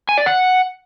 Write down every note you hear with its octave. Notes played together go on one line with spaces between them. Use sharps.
G#5
D5
F#5